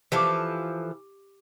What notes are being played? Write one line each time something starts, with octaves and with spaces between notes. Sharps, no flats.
E3 F3 G4 A4 C#6 D6